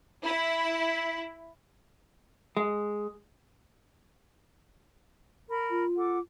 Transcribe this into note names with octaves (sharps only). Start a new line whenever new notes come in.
E4
G#3
A#4 B5
F4
A4 F#5 D6